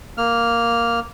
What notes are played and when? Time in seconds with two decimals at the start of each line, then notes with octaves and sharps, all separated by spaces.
0.18 A#3 F6